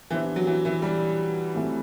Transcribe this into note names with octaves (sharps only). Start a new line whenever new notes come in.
E3 B3 D4 G4 C5 E5
F#3
E3
E3
G3
E3 A3 C4